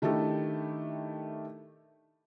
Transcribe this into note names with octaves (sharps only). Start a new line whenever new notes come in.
D#3 A3 D4 E4 G4 A4